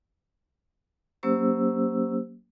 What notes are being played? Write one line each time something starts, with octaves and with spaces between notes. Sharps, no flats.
F#3 A#3 C#4 G4 C5 E6